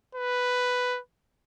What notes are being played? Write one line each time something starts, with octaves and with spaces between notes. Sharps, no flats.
B4